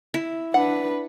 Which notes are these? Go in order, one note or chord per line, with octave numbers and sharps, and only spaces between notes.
E4
D4 B4 F#5